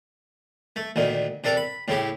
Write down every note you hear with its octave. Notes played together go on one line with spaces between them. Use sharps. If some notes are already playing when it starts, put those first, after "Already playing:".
A3
D2 A#2 D#3
C3 D4 A4 A#4 D6
B5
A2 C#3 E4 G4